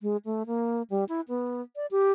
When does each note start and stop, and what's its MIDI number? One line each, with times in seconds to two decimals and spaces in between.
0.01 0.17 56
0.25 0.43 57
0.46 0.82 58
0.90 1.04 55
1.09 1.21 64
1.28 1.61 59
1.76 1.86 74
1.91 2.12 67